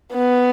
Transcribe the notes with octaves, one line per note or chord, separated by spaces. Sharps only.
B3